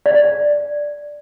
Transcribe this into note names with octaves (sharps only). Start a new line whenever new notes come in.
D5